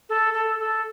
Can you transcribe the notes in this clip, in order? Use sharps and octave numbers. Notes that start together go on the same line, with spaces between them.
A4
A4
A4